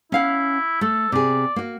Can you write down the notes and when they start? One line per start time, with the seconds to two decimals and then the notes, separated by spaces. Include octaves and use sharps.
0.12 C#4 E4 F5 F#5
0.81 A3 A4
1.12 C3 G#4 D5
1.56 A#3 F#4